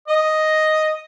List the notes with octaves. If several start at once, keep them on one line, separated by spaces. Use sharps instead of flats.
D#5